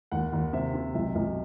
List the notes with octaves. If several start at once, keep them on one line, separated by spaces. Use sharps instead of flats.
D#2 F#5
D#2
C3 E5
C3
B1 E5
B1